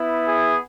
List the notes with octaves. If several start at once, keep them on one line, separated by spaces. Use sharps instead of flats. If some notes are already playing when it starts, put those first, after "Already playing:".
Already playing: B3 E4
G#4